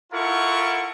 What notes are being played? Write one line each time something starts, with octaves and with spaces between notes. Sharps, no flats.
E4 F4 A4 A#4 F#5 C#6